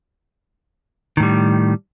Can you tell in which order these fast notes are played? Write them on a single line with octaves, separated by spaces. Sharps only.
D#3 A2 G3